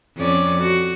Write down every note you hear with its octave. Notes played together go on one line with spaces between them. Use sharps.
F2 C#4 D5
F#4